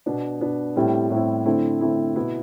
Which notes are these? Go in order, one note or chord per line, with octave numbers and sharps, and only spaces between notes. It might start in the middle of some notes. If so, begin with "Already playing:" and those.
B2 B3 D4
B2 B3 D4
A2 G3 C4 E4
A2 G3 C4 E4
D3 A3 C4 E4
D3 A3 C4 E4
B2 B3 E4